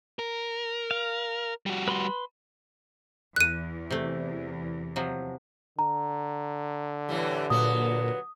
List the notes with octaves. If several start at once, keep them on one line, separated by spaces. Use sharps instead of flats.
A#4
F5
G3 F#4
B4 B5 C6
E2 F#6 D#7
C3 A3
C3 F3 F#3
D3 A#5
A2 E3 G3
A#2 F#3 B3 D#6